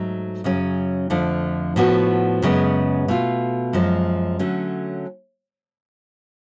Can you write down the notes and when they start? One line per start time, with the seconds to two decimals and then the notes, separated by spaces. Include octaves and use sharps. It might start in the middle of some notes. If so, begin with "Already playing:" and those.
Already playing: G#2 F#3 A3
0.44 F#2 C#3 F#3 C#4
1.10 F2 D3 F3 A3
1.76 A2 F3 B3 F#4
2.42 F#2 C#3 G#3 B3
3.08 B2 A3 F4
3.73 F#2 F3 G#3
4.39 D3 F#3 A3 C#4